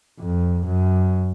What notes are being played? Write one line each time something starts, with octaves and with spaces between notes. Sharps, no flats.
F2
F#2